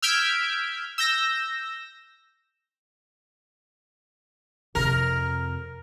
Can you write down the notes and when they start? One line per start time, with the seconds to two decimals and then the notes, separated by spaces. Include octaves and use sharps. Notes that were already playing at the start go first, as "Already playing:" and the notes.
0.02 E6 F6 G6 G#6 B6 D7
0.98 E6 G6 A#6
4.75 F2 C3 A#4